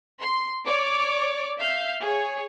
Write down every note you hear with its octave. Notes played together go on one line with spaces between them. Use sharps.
C6
C#5 D5 D6
E5 F5 G6
G#4 C#5